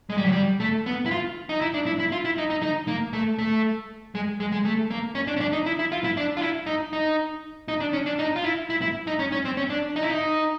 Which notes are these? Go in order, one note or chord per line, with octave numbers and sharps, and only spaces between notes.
G#3
G3
F#3
G3
A3
B3
E4
F4
D#4
E4
D4
E4
E4
F4
E4
D#4
D#4
D#4
A#3
A3
A3
G#3
G#3
G#3
A3
A#3
C#4
D4
C#4
D4
D#4
E4
E4
F4
E4
D4
F4
E4
D#4
D#4
D#4
D4
C#4
D4
D#4
F4
E4
E4
E4
D#4
C#4
C#4
C4
C#4
D4
D#4
E4
D#4